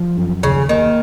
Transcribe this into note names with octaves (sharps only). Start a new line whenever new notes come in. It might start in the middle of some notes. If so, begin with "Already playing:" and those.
Already playing: F3
F#2
D#2 C#3
D#3 A#3